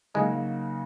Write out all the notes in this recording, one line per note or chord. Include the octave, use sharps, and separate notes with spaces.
C#3 F#3 G#3 A#3 D#4 F#4